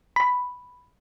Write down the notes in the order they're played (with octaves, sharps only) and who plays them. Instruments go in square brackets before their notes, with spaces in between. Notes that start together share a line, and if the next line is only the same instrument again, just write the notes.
[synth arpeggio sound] B5